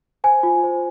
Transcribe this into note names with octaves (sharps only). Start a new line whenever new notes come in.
C5 G#5
F4
C5